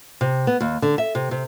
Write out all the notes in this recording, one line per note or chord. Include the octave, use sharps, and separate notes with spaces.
C3
B3
D#2
D3
E5
C3
C3